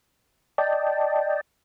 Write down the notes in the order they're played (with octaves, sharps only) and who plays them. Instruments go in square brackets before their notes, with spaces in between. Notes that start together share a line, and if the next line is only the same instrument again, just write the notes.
[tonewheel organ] D5 D#5 G5 A5